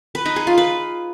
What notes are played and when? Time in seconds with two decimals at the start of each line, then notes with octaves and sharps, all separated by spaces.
0.15 B4
0.26 D#4
0.36 G#4
0.47 F4
0.58 B4